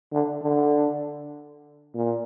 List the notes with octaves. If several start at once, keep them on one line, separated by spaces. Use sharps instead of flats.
D3
D3
A#2